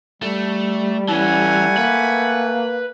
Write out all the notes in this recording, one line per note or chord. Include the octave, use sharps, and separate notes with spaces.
G3 A3
E3 A3 C#4 F#5 G#5
A#3 B4